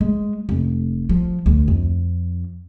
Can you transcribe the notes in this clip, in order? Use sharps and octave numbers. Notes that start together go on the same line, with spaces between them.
G#3
F1
F3
D2
F2